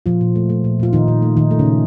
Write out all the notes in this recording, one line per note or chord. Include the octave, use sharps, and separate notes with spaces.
A#2 F3 F4
A#2
A3
A3
A#2
A#2 F4
A#2 D#3 D#4
A#2
A3
A#2 D#3 D#4
A3
C#3 C#4
A#2